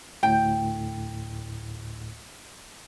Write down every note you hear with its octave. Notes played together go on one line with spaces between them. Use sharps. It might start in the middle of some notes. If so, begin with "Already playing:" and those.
D2 A2 G5